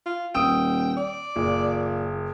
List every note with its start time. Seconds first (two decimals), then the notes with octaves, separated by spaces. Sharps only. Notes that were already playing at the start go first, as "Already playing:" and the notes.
0.06 F4
0.35 D#1 G5 D#6 E6 D7
0.96 D5
1.36 F#1 A#2